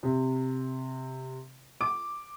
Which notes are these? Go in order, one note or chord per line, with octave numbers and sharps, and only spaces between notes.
C3
D6